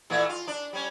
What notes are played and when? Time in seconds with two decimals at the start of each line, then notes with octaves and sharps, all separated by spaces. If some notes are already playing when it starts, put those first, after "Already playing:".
0.10 A#2 E3 A3
0.29 F4
0.47 D4
0.73 G3 C#4